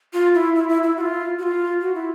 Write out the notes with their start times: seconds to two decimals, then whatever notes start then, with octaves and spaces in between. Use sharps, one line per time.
0.13 F4
0.35 E4
0.56 E4
0.69 E4
0.83 E4
0.97 F#4
1.01 F4
1.39 F#4
1.43 F4
1.81 F#4
1.94 E4